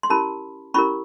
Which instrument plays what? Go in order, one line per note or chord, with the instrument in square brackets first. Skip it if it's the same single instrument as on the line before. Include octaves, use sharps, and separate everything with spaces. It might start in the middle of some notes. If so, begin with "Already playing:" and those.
[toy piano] C6
C#4 E4 G4 A#4 A5 B5
C#4 E4 G4 A#4 B5 C#6